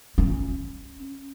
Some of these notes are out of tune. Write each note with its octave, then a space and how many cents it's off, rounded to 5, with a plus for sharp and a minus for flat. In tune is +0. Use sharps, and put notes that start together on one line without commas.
C#4 -15